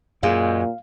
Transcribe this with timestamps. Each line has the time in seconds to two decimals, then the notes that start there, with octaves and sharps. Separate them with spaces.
0.23 F#2 A#2 G#3 F5